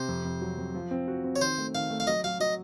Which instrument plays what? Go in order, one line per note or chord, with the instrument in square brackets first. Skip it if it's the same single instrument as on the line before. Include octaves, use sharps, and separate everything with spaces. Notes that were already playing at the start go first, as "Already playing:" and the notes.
Already playing: [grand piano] C3 [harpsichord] C5
[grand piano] F2
F2
F#3
F2
F3
C4
F#4
C4
[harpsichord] C#5
[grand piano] D#3 [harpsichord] C5
[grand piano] A3
[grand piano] D#3 [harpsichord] F5
[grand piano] A3
[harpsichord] F5
[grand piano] F#3 [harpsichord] D#5
[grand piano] F#3 [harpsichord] F5
[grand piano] F#3 [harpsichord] D#5